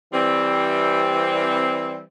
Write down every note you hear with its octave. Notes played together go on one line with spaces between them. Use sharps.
E3 G3 C4